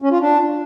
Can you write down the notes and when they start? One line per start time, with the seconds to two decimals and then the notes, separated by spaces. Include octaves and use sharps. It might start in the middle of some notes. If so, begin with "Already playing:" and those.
0.02 C#4
0.11 F4
0.21 D4